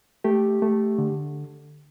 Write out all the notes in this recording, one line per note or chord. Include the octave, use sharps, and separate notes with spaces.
A3 G4
A3
D3